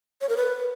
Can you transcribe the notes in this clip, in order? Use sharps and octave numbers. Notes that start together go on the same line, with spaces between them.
C#5
A#4
B4